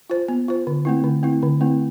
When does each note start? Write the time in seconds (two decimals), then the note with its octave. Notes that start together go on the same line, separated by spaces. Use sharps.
0.10 F4 C5
0.29 B3
0.48 F4 C5
0.67 D3
0.85 A3 C4 E4
1.04 D3
1.23 A3 C4 E4
1.42 D3
1.61 A3 C4 E4